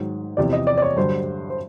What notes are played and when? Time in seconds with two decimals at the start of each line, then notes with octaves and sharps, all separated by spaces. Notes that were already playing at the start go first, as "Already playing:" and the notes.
Already playing: G#2 D#3 F#3
0.37 E2 C3 F3 D5
0.53 D#5
0.67 D5
0.78 D5
0.82 C#5
0.96 G2 D3 F#3 C5
1.50 C5